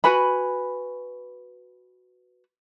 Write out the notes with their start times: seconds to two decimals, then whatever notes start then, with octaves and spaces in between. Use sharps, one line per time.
0.04 F#4 B4 G#5 B5